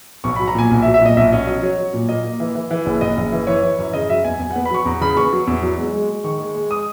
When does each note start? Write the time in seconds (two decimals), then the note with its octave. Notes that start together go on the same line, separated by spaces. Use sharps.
0.24 B1 C#6
0.36 F#3 B5
0.48 A#5
0.55 A#2 G#5
0.71 B1
0.82 E5
0.86 F#3
0.94 E5
1.01 A#2 D#5
1.17 B1 E5
1.32 C#4 D#5
1.47 F#3 D#5
1.62 F#3 C#5
1.78 F#3
1.94 A#2
2.09 A#3 D#5
2.24 A#3
2.40 E3
2.55 E3
2.71 E3
2.86 F#1
3.01 F#1 D#5
3.17 F#1
3.32 E3
3.47 E3 C#5
3.63 E3
3.79 F#2
3.93 C#3 D#5
4.10 F#3 E5
4.25 E2 G#5
4.40 E2 G#5
4.51 F#5
4.56 B3
4.65 B5
4.70 F#3 C#6
4.85 E2 A#5
5.01 C#3 B5
5.17 B3 C#6
5.33 F#3
5.47 E2
5.63 F#3
5.78 G#3
5.94 G#3
6.09 G#3
6.24 D#3 C#6
6.40 G#3
6.55 G#3
6.71 D#6